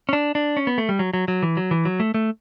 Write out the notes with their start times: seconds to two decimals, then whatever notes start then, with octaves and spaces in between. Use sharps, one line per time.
0.09 C#4
0.13 D4
0.35 D4
0.57 C#4
0.67 B3
0.78 A3
0.89 G3
0.99 F#3
1.13 F#3
1.28 F#3
1.43 E3
1.57 F#3
1.71 E3
1.85 F#3
2.00 A3
2.14 A3